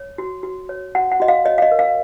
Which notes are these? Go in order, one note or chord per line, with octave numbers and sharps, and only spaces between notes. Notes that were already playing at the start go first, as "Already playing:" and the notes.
Already playing: C#5
F#4
F#4
C#5
F#4 F#5
F#5
F#4 D#5
F5
C#5 D#5
F5
D#5
A#4
F5